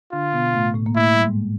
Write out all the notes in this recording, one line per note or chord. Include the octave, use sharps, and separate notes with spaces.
D3 D4 F4
B2 B3
A2 A3
A2 A3
A#3
A2 A3 E4
G3
G#2 G#3